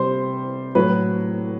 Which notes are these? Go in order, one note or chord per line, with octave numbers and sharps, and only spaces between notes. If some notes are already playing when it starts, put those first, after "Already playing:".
Already playing: C3 G3 C5
A2 F#3 B4